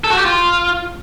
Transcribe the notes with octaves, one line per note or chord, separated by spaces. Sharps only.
A4
F#4
G4
F4